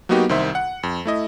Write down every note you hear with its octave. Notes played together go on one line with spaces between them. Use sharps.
F#3 A#3 B3 D#4 F#4 G4
C2 D#3 C5 E5
F#5
F2
A3 E4 D#5